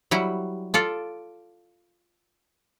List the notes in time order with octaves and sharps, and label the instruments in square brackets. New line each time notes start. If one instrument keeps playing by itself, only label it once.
[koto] F#3 G3 E4
F4 A4 D5